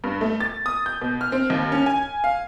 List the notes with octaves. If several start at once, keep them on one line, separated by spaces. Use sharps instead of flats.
G2
A3
A6
D#6
G6
B2
F6
C4
D#2
C#4
G#5
F5